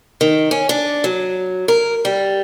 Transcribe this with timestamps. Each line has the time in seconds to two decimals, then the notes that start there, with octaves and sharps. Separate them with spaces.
0.21 D#3
0.51 C#4
0.69 D4
1.04 F#3
1.68 A#4
2.05 G3